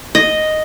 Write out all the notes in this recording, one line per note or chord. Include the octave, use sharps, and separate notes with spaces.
D#5